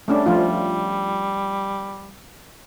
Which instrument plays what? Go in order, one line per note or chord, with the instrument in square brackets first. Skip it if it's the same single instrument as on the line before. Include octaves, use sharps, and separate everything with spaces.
[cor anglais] G3 [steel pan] A3 C#4 D4
[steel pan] F3 A3 F4 [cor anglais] G3